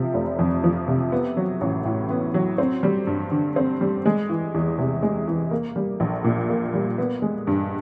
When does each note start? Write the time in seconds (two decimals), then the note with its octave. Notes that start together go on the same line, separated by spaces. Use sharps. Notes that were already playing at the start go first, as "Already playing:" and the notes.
Already playing: C3 F3
0.14 F1
0.39 F2
0.64 F3
0.88 C3
1.12 B3
1.37 F#3
1.61 A1
1.85 A2
2.10 B3
2.34 F#3
2.58 C4
2.83 G3
3.07 G2
3.32 D3
3.56 C4
3.81 G3
4.06 G#3
4.30 E3
4.54 E2
4.78 C3
5.03 G#3
5.28 E3
5.51 A#3
5.76 G3
6.00 A#1
6.24 A#2
6.50 A#3
6.74 G3
6.98 B3
7.22 G#3
7.47 G2